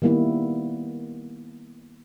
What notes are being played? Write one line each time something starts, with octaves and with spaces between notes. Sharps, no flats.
D#3 G3 A#3 B3 E4